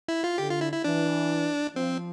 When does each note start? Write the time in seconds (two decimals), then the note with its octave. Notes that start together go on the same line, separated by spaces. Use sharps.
0.08 E4
0.24 F4
0.38 D3 G4
0.50 F4
0.61 E4
0.72 E4
0.84 E3 D4
1.76 F3 C4